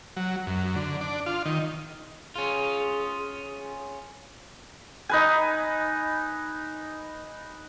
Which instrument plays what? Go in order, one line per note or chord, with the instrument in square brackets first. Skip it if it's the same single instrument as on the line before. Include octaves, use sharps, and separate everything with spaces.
[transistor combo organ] F#3
F#2
D3
D4
F4
D#3
[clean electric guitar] C#4 F4 [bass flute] G#4
[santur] D#4 B4 G#5